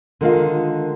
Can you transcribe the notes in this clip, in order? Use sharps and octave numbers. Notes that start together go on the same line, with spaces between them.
D3 D#3 G#3 F4 A#4 F5